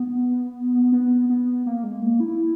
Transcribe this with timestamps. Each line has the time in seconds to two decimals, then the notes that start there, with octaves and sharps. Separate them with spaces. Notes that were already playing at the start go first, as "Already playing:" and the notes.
Already playing: B3
0.92 B3
1.30 B3
1.66 A#3
1.84 G#3
2.02 A#3
2.20 E4